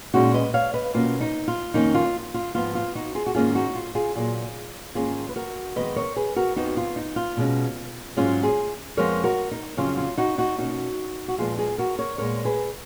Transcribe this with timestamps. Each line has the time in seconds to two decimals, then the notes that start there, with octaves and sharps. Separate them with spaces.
0.14 A#2 G#3 C#4 D#4 F#4
0.34 B4 D#5
0.54 C#5 F5
0.74 B4 D#5
0.94 B2 A#3 C#4 F4
1.21 D#4
1.48 F4
1.74 F2 D#3 A#3 C#4 D#4
1.94 F4
2.34 F4
2.54 G#2 F3 B3 F4
2.75 F4
2.95 D#4 F#4
3.15 F4 G#4
3.26 F#4
3.34 G#2 D#3 A#3 C#4 F4 G#4
3.55 D#4 F#4
3.75 F4
3.95 F4 G#4
4.15 A#2 F#3 A#3 F4 G#4
4.95 G#2 D#3 A#3 C#4 F4 G#4
5.29 B4
5.36 F#4 A#4
5.75 F2 D#3 G#3 B3 B4 D#5
5.96 A#4 C#5
6.16 G#4 B4
6.36 F#4 A#4
6.56 F2 F3 B3 D#4 F#4
6.77 F4
6.96 D#4
7.16 F4
7.37 B2 G#3 C#4
8.17 G#2 F#3 C#4 F4 G#4
8.43 F4 G#4
8.97 F2 F3 G#3 B3 A#4 C#5
9.24 F#4 A#4
9.51 D#4
9.77 F2 C#3 F#3 C#4 F4
9.97 F4
10.17 D#4 F#4
10.38 D#4 F#4
10.58 B2 A#3 C#4 D#4 F#4
11.28 F#4
11.38 A#2 F3 G#3 B3 F4 G#4
11.58 F4 G#4
11.78 F#4 A#4
11.98 A#4 C#5
12.18 A#2 G#3 B3 A#4 C#5
12.45 G#4 B4